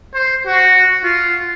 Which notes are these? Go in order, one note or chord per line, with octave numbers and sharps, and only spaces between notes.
C5
F#4
F4